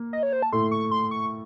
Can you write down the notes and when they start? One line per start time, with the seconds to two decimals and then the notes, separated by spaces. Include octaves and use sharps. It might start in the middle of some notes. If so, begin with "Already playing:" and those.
Already playing: A#3
0.13 D#5
0.23 C#5
0.33 C5
0.42 A5
0.52 A2 A3 C6
0.71 C#6
0.91 C6
1.11 C#6